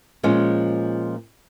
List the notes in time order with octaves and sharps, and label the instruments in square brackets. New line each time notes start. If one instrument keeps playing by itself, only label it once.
[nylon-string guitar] A#2 F3 G#3 C#4